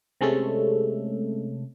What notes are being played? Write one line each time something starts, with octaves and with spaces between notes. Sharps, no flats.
C3 G#3 A3 C#4 A4